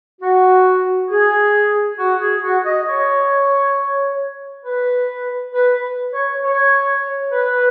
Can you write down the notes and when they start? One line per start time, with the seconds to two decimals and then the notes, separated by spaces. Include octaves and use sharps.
0.21 F#4
1.10 G#4
1.99 F#4
2.21 G#4
2.43 F#4
2.65 D#5
2.88 C#5
4.66 B4
5.54 B4
6.13 C#5
6.43 C#5
7.32 B4